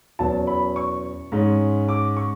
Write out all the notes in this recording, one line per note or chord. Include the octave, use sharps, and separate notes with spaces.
E2 B2 F#3 C#4 A5
B5
C#6
G#2 G#3 C#4
D6
C#6